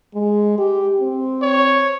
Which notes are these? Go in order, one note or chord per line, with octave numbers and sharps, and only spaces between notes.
G#3
G4
C4
C#5